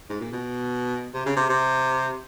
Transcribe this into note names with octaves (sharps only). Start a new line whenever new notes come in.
G#2
A#2
B2
C3
C#3
C3
C3